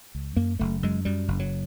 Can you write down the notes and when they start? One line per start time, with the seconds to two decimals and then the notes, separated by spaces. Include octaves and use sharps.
0.15 C#2
0.36 F#2 A#3
0.59 F#1 A3
0.83 F#2 G#3
1.05 F#2 G3
1.28 F#1
1.40 F#3